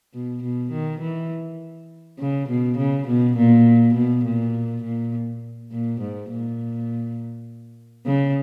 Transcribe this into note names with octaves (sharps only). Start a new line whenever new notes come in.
B2
B2
D#3
E3
C#3
B2
C#3
B2
A#2
B2
A#2
A#2
A#2
G#2
A#2
C#3